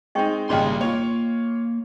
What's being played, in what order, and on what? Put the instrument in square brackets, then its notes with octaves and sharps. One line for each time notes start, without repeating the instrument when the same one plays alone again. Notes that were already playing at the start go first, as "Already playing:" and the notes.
[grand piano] G#3 C4 D#4 [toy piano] D#5 G5 C#6
[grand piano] G#1 A#2 C#3 [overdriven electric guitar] G3 C6 [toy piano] C5 D#5 G5
[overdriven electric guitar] A#3 [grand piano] F4 C#5